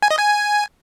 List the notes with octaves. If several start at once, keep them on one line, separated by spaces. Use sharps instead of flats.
G#5
D#5
G#5